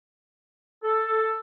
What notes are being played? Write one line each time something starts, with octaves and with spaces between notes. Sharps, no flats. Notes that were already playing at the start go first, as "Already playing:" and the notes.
A4